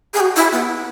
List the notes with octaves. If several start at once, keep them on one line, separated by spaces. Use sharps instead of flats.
G#4
F#4
E4
B3